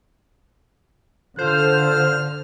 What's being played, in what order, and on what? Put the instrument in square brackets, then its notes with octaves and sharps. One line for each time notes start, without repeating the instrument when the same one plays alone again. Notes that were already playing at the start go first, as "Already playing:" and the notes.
[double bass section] D3 [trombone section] F4 A4 [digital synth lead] C5 [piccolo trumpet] F6